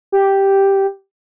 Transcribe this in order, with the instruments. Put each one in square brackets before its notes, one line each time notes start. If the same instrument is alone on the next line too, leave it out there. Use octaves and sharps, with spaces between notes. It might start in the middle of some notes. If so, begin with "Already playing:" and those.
[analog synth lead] G4